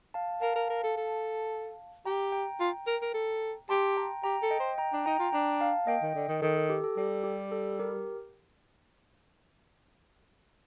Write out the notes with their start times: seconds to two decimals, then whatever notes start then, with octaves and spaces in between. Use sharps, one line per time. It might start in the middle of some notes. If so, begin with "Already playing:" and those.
0.14 F5 A5
0.41 A#4 F5 A5
0.56 A#4
0.70 A#4
0.83 A4
0.97 A4
2.05 G4 G5 A#5
2.32 G5 A#5
2.60 F4
2.87 A#4
3.02 A#4
3.14 A4
3.69 G4 A5 C6
3.97 G5 A#5
4.23 G4 G5 A#5
4.42 A4
4.51 D#5 G5
4.60 C5
4.78 G5 A#5
4.93 D4
5.06 D#4 G5 A#5
5.19 F4
5.33 D4 G5 A#5
5.60 F5 A5
5.87 A#3 D#5 G5
6.02 D#3
6.15 D3
6.28 D#3
6.42 D#3 A4
6.57 A4
6.70 G4
6.84 A4
6.97 G3 A4
7.24 G4
7.52 A4
7.79 G4 A#4